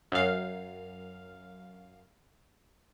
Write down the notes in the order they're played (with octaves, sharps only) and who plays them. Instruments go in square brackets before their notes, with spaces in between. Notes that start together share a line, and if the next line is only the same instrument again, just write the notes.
[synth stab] F#2 F5